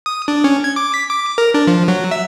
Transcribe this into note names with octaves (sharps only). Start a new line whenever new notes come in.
D#6
D4
C#4
G#6
D6
B6
D6
A#4
D4
F3
F#3
E5